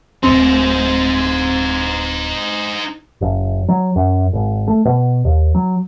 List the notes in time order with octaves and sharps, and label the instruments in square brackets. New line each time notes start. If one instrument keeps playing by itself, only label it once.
[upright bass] D1 A3 [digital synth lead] C4 [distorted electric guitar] D#4 C5
[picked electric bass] F#1
F#3
F#2
G#1
A3
B2
D#2
F#3